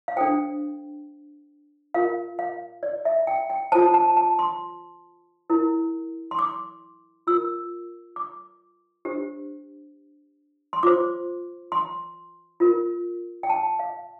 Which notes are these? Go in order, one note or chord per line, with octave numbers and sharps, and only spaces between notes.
F5
D4 A4 C5 G5
F4 A#4 F5
F5
D5
E5
G5
G5
F4 A4 C5 A5
A5
A5
C6
E4 A#4
C6
D6
F4 A#4 E6
D6
D4 G4 C5
C6
F4 C5 D6
C6
F4 A#4
G5
A5
F5